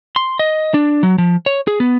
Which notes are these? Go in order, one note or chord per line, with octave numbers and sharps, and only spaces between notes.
C6
D#5
D4
F#3
F3
C#5
G#4
B3